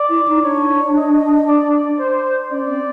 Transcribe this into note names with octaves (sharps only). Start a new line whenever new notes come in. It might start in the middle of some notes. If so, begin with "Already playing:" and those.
Already playing: D5
E4
D#4
D4 C#5
D#5
D5
C5
C#4 D5
C4